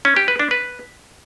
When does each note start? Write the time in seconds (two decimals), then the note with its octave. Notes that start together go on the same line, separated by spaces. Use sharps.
0.05 C#4
0.16 G4
0.28 B4
0.39 D4
0.51 B4